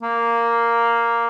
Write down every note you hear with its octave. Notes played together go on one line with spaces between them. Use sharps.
A#3